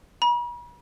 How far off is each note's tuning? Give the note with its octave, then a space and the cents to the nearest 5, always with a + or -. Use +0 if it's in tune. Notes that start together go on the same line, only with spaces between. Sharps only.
B5 -45